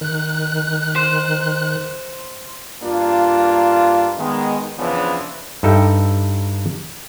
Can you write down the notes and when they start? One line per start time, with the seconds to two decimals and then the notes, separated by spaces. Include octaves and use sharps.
0.01 D#3 F#6
0.96 C5
2.83 G2 A#3 D4 F4
4.18 D#3 G#3 B3
4.78 E2 C#3 E3 F3 B3 D4
5.63 G2 D#4 A4 E5 G5